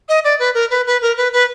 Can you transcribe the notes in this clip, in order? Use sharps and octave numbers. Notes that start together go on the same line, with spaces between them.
D#5
D5
B4
A#4
B4
B4
A#4
B4
B4